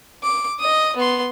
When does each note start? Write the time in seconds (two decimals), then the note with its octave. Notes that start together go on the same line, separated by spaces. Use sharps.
0.23 D6
0.60 D#5 D#6
0.96 B3 C6